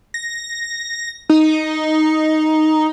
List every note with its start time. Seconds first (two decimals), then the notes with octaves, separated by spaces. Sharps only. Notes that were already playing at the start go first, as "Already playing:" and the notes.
0.14 A#6
1.29 D#4